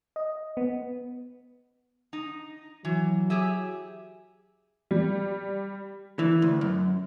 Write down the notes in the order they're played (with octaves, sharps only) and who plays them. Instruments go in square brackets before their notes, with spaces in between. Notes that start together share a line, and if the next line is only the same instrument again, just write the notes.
[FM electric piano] D#5
B3
[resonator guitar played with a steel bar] D#4
[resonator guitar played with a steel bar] E3 [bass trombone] F#3
[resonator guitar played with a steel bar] G4 G#4 E5
[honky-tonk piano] G3
[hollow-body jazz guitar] E3
D2
F#2